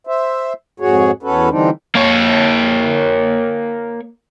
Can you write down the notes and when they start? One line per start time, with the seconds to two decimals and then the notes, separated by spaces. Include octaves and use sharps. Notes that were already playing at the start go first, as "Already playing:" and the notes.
0.07 C5 E5
0.80 F2 G#2 F#4 G#4 C#5
1.23 E2 C#4 F#4 A4 B4
1.49 D3 E3 G3 C4 D4 D#4
1.95 A#3 C#5